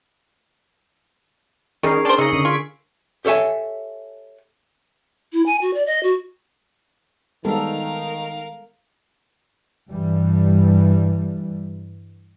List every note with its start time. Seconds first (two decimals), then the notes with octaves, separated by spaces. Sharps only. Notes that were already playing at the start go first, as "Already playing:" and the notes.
1.83 D#3 G3 C#4 D#4 G#4 A#4 C#6 C7
2.05 D4 C5 D5 G5 C6
2.19 C#3 D#4 D#5 E6 C#7
2.33 D3
2.45 F4 G#6 B6 D7
3.25 G4 A4 C#5 E5 G#5
5.33 E4
5.46 G#5
5.61 F#4
5.74 D5
5.86 D#5
6.03 F#4
7.45 D#3 G3 G#3 B3 A4 A#4 F5
9.89 G2 E3 G3